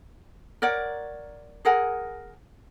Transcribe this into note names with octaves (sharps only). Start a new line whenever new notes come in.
A#4 C#5 D5 F#5
G#4 A#4 F#5 G#5